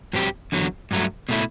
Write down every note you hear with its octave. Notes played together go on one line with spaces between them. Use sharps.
G2 F#3 C4 G4
E2 D3 F#3
G2 F#3 A3
B2 A3 E4